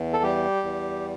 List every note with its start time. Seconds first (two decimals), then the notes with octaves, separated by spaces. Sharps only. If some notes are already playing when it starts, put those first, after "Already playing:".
Already playing: E2
0.13 A4
0.23 G3 G4
0.63 E2